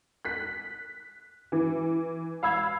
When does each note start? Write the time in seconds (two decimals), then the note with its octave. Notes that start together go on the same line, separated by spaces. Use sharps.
0.25 F#6 B6
1.52 E3
2.43 F5 B5 E6 G#6